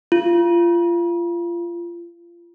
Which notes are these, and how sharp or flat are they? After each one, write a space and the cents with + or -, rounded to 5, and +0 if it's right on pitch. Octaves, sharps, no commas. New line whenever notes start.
F4 -25